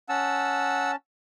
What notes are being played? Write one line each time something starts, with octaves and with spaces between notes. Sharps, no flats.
C#4 F#5 A5 E6